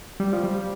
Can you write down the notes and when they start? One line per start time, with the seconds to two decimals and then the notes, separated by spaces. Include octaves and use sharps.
0.20 G3
0.33 F3
0.44 G3